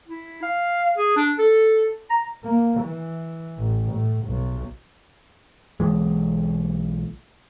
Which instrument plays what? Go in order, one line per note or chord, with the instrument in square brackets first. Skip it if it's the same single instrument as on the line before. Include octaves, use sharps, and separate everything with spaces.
[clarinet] E4
F5
G#4
D4
A4
A#5
[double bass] A#3
E3
A1
A2
B1
[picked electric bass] B1 E3 G#3